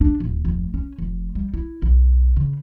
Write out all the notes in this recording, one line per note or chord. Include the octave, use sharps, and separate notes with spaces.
D4
D1
F1
C#4
F1
G3
E4
B1
C#3